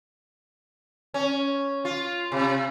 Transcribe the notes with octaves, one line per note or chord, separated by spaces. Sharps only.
C#4
F4
C3